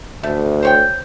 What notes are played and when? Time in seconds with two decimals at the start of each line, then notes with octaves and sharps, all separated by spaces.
0.23 D2 A3
0.63 C5 C#5 G5